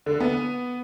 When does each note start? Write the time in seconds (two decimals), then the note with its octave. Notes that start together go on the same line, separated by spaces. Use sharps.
0.06 D3
0.20 B3